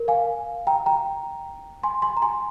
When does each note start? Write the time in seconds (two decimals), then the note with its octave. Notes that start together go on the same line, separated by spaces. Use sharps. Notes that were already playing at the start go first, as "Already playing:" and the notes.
Already playing: A#4
0.08 F5 G#5
0.67 G5 A#5
0.86 G5 A#5
1.83 G#5 C6
2.02 G#5 C6
2.17 A#5
2.22 G#5 C6